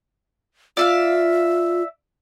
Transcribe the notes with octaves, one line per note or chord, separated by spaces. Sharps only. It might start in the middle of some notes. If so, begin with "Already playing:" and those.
F4 D5 E5 F5